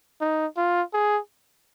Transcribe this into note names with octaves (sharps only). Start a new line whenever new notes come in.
D#4
F4
G#4